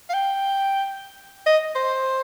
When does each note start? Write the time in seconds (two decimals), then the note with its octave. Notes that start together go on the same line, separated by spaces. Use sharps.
0.09 F5
0.14 G5
1.46 D#5
1.75 C5